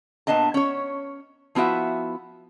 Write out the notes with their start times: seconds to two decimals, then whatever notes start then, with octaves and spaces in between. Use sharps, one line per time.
0.27 A#2 B3 D4 D#5 A5
0.54 C#4 C#5
1.55 F3 B3 E4 F#4 E5